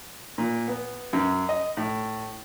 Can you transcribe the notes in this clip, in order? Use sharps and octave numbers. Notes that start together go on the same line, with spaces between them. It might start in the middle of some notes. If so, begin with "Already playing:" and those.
A#2
B3
F#2
D#5
A2